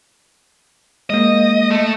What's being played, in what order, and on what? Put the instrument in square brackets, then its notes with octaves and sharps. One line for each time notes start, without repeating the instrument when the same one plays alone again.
[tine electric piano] G#3 A#3 [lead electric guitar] D#5
[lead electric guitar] A3